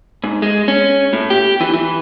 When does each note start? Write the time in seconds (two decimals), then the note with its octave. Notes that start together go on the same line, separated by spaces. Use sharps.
0.24 G#2
0.42 G#3
0.68 C#4
1.13 A2
1.30 G4
1.61 E3
1.73 E3